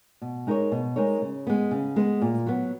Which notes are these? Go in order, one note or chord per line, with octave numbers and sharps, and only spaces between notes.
B2
G#3 D#4 A#4 C#5
B2
G#3 D#4 A#4 C#5
C#3
G#3 B3
C#3
G#3 B3
A#2
F#3 B3